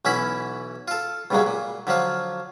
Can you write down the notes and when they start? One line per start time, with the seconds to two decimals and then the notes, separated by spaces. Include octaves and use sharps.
0.05 B1 E3 C#4 E4 F#4 B5
0.88 F4 A4
1.31 C#2 G2 A#2 C#3 F#3 G#3
1.46 A#2
1.87 D3 F3 F#3 F4